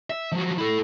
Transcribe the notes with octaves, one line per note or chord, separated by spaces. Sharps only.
E5
F3 F#3
E4 A4